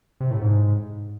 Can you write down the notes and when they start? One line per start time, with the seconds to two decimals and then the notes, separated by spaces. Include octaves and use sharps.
0.20 C3
0.31 A2
0.41 G#2